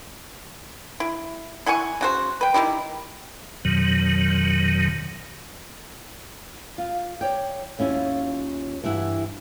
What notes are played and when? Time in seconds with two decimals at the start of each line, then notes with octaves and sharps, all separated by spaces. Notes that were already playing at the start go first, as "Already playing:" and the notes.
1.00 E4
1.66 E4 F#5 G#5 C#6
2.01 C#3 F#4 C5
2.41 B4 G5
2.54 D#3 G#3 E4 G4
3.65 F2 B2 D#3 F#3
6.78 F4
7.21 C#5 D5 G5
7.79 D#2 C#4 E4 F4
8.84 G2 E3 E4 F#5